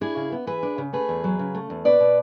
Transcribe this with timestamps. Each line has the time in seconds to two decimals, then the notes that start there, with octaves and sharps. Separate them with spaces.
0.01 D4 E4 G#4
0.17 C#3
0.32 B3
0.47 E3 G#4 B4
0.63 D4
0.78 C#3
0.93 A3 G#4 B4
1.09 E2
1.24 F#3
1.39 C#3
1.54 A3
1.70 E2
1.85 B2 B4 D5
2.00 B2